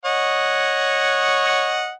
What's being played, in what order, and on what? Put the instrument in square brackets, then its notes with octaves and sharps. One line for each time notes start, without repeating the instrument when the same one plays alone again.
[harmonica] C#5 D#5 F#5